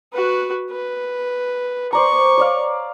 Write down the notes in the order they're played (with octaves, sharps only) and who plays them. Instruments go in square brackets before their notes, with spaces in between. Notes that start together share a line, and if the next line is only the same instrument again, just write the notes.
[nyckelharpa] F#4 B4
B4
[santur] C5 D5 A#5 [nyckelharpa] C#6
[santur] C#5 D5 F5